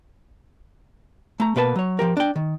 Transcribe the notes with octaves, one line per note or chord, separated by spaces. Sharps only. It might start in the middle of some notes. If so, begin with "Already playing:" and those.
A3 A#5
B2 A#3 B4 C5 A5
F#3 C#5
F3 G4 A#4
D4 G5
D#3